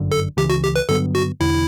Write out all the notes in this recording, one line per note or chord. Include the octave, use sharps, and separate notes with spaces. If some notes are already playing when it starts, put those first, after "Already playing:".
Already playing: G1 F#2 D3
A4
C#2 C#3 E3 G4
F#4
G4
B4
G2 D3 F#3 B3 A4
F#4
E1 E2 D3 E4